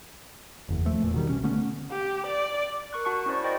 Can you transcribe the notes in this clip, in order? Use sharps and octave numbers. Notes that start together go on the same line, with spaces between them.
F#1 E2
D#1 F3 A3
E2 A#2
B2 D#3 G3
B1 C#4
D3 A3 B3 C#4
G4
D5
A#4 C#6 F#6
F#4 F#5 A5 C#6 C#7
C#4 E4 F#4 C5 D5
C5 D5 D#5 G5 A6